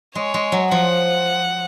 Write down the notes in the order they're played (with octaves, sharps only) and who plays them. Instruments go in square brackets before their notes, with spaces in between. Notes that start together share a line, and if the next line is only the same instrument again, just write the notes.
[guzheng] G#3 [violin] C#5
[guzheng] G#3
F#3
[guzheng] F3 [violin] F#5